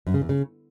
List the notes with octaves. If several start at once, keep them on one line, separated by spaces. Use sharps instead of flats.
F#2
C#3
E2
C#3